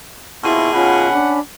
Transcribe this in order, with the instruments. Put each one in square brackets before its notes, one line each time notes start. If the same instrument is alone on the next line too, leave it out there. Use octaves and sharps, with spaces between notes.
[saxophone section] D#2 B2 G#4 [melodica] C4 F4 C#6 [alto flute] E4
[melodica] C#4 B5 [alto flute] F4 [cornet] F#5
[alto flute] D4